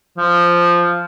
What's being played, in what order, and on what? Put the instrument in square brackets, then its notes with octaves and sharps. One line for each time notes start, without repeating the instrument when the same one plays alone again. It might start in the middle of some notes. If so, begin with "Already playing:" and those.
[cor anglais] F3